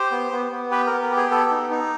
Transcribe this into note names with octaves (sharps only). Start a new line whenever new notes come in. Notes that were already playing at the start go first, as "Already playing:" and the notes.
Already playing: G4 C5
B3
B3
B3
G4 B4
A#4
B3
A#4
G4
G#4
B3 A4
D#4
D#4